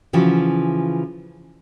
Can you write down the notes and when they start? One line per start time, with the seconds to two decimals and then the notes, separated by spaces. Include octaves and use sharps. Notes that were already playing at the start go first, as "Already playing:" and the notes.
0.13 C#3 E3 F3 F4 F#4